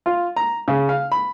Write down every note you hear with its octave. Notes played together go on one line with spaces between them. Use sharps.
F4
A#5
C#3
F5
B5